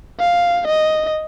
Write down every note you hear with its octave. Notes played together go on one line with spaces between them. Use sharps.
F5
D#5